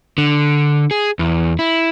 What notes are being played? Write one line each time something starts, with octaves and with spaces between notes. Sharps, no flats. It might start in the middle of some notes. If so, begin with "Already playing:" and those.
D3
G#4
E2
E4